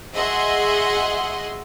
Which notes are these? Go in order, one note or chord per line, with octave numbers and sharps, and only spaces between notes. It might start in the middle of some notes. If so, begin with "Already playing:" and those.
F#4 G#4 D#5 E5 F#5 C6